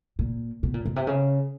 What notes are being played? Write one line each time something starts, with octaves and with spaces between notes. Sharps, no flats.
A#2
B2
A#2
B2
C3
C#3